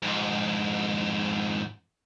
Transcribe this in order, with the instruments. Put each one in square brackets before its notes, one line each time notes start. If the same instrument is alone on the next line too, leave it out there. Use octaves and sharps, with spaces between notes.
[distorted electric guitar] F2 G#2